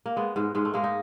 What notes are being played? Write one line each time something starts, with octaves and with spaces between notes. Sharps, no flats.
A#3
G#3 B3
G#2 G#3
G#2 G#3
A3
G#3 A#3
D#4